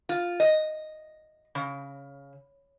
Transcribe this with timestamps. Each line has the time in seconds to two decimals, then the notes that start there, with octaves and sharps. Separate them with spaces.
0.09 F4
0.40 D#5
1.55 C#3